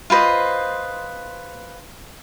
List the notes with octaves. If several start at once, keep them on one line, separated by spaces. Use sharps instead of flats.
F4 B4 C5 D#5